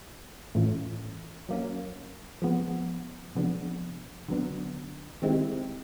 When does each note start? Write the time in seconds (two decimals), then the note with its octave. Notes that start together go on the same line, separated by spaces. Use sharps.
0.55 A2 E3 A3 C#4 F4
1.49 F#3 A#3 C#4
2.42 F3 G#3 B3
3.35 C3 F3 G#3 B3 D4
4.28 D3 F#3 B3 D4
5.22 D#3 G#3 C4 E4 G4